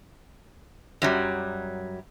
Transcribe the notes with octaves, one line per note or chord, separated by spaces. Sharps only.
F#2 F#3 G3